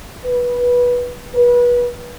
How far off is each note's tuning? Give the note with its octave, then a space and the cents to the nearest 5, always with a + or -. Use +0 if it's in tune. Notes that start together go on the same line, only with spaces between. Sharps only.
B4 -15
B4 -30